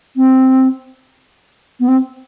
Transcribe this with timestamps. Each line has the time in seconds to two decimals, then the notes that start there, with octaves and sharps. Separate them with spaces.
0.16 C4
1.80 B3
1.88 C4